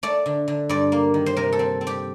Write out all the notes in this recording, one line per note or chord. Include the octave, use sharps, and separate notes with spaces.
A3 D5
D3
D3
G2 D5
A#3
D#3
C5
C3 A#4
A4
C4
C4
G4